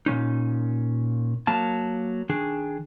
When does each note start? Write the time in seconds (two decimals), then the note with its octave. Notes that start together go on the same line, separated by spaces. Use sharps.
0.06 A#2 F3 C#4 D#4
1.47 F#3 A#3 A5
2.29 D#3 D4 G#4